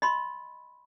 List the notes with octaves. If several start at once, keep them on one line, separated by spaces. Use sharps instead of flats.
D#5 B5 C6